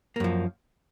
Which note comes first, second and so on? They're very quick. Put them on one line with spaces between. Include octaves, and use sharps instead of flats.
A#3 F#2 F3